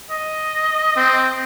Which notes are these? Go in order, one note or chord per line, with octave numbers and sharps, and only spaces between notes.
D#5
C4